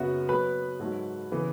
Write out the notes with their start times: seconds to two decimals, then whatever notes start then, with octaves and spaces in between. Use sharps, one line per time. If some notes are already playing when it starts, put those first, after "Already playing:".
Already playing: F#2 C#3 F#3 B3 F#4 E5 F#5
0.29 B2 F#3 B3 B4 B5
0.79 G#2 F#3 A3
1.32 C#3 E3 B3